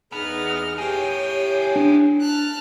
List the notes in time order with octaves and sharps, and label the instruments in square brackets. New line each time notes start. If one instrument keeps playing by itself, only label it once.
[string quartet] E2 D#4 F6 [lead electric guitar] B3 [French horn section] G#4
[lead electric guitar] A3 G#4 [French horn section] E4 G4 [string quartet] C#5 G5
[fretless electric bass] D4
[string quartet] A5 F6 F#6